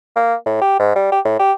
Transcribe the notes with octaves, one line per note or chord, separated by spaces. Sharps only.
A#3
A2
G4
G#2
G3
G4
A2
G4